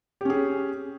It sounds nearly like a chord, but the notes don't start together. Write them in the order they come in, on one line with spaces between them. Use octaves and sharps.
G4 C#4 G#4